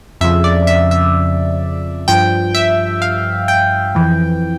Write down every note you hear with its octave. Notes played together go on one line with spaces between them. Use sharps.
F2 C#3 F3 E5
D5
E5
E5
G2 F3 G5
E5
F5
G5
F2 E3